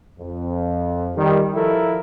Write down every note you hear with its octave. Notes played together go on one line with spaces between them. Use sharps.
F2
D#3 G3
F3 E4 A4 A#4